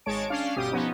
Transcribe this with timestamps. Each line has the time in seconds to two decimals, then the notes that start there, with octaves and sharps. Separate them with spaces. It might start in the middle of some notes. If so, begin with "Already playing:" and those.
0.06 G#1 G#3 C#5 A5 D7
0.30 C#4 D4 F5
0.56 G1 B2 G4 D#6
0.72 F3 B3 C#4 D#4